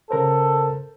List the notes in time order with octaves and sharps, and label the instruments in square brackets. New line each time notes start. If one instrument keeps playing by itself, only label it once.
[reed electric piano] C#3 A#4 C5 [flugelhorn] A4